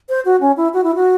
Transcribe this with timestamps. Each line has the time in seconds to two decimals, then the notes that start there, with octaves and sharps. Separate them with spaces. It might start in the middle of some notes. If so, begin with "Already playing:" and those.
0.09 C5
0.25 F#4
0.41 C#4
0.57 E4
0.74 F#4
0.84 E4
0.95 F#4